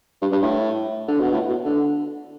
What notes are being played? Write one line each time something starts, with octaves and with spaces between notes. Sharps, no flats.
G2
G2
A2
D3
B2
A2
B2
D3